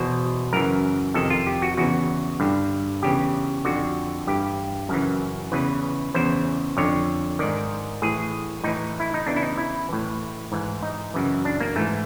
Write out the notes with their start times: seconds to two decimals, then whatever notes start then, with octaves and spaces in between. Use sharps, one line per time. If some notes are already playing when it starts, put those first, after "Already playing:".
Already playing: E2 B2 C5
0.52 F#2 C#3 E3 A#4
1.14 F2 C3 D#3 A4
1.30 F4
1.47 G4
1.62 F#4
1.77 E2 C#3 E3 F#4
2.40 G2 D3
3.03 E2 C#3 E3 G4
3.65 F2 D3 F#4
4.27 G2 E3 G4
4.89 F#2 C#3 E3 A#4
5.52 E2 C#3 E3 B4
6.14 E2 C#3 E3 C5
6.77 F2 D3 C#5
7.39 G#2 D#3 D5
8.02 A2 E3 G#4
8.64 A2 E3 D#4
9.00 E4
9.14 D#4
9.26 E2 C#3 E3 D4
9.36 E4
9.42 D#4
9.58 E4
9.89 A2 E3
10.52 G#2 E3
10.83 D#4
11.14 F#2 C#3 E3
11.45 D4
11.60 A#3
11.76 G#2 E3 A3